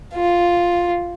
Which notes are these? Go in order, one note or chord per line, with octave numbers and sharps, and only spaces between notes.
F4